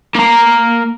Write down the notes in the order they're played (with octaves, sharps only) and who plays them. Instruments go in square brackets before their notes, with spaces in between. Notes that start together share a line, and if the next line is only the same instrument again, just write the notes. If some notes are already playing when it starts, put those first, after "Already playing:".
[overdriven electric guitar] A#3 A#5